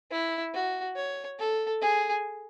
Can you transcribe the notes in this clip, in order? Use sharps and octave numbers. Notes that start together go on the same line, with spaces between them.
E4
F#4
C#5
A4
G#4